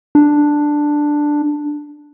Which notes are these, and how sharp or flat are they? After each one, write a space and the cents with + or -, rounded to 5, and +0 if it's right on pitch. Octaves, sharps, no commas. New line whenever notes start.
D4 +5